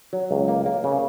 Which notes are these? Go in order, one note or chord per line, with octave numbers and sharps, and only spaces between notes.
F#3
C#2
A#3
A#3
C#3